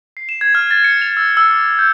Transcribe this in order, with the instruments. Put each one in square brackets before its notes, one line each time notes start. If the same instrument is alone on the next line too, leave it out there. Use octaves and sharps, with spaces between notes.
[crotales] C7
E7
G#6
F6
A6
C#7
F7
E6
E6
D6
G6